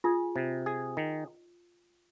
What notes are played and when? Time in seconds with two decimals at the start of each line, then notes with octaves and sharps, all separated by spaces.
0.04 F4 G#4
0.36 C3
0.66 G#4
0.97 D#3